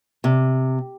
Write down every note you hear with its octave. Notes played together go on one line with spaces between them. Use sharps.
C3